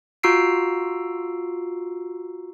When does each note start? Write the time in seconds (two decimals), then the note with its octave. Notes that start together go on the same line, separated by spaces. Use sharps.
0.23 F4 F#4 A#5 E6 C7 D7